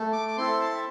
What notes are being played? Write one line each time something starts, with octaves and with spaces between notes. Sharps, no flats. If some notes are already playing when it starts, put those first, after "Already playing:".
Already playing: A3
D6
D6
C4 E4 A4 C6
A5
E5